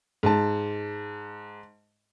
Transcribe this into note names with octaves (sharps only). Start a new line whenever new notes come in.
G#2 A5